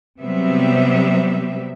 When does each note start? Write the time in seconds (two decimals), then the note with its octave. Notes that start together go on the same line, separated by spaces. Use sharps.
0.21 C3 F#3 G3 B3 C4 E5